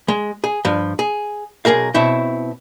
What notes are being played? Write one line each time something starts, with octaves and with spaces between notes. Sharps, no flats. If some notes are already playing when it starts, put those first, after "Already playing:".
G#3
G#4
G2 F3
G#4
B1 C#3 G#4 A#4 F5
B2 C4 E4 C#5